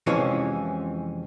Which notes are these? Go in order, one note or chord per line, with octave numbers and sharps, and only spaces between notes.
F2 C3 E3 F3 G#3 C#4